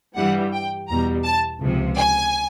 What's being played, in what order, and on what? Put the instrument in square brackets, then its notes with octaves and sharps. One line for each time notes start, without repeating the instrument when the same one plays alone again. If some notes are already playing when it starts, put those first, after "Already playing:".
[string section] G2 E3 G3 F#5
G5
E2 B2 G3 A#5
A5
C#2 C3 F3
G#5